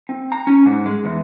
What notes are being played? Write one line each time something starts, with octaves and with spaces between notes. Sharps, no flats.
C4
A#5
C#4
G#2
G#3
E2